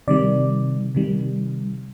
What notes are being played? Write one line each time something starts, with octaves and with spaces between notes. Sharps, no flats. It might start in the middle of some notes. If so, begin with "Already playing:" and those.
C3 D#3 G3 D5
C3 D#3 G3